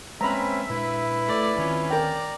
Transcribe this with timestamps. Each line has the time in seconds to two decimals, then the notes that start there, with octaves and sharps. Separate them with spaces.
0.21 G#3 A#3 C4 C#4 B4 E5 A#5 B5
0.69 A#2 G#3 D4 E4 B4
1.26 A3 D5
1.56 D2 D#3 C4 C#4 F4
1.90 A#4 D5 G5 A#5